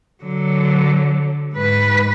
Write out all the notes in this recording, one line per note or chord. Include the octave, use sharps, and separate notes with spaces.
D3 F#3
G#2 B4